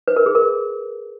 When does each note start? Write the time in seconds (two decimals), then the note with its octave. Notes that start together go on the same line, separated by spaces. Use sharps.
0.08 B4
0.16 A#4
0.26 G#4
0.35 A#4